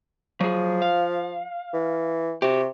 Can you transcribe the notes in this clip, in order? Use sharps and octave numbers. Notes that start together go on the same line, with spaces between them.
F3 F#3 G#4
F5
E3
C3 F#4 G4